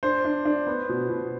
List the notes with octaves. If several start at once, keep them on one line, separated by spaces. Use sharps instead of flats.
D4 C5
D4
D4
B3
B2
B2